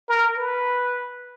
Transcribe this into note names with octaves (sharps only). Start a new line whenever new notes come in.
A#4
B4